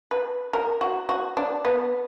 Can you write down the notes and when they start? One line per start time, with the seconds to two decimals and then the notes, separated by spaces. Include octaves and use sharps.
0.11 B4
0.53 A#4
0.81 F#4
1.09 F#4
1.37 D4
1.65 B3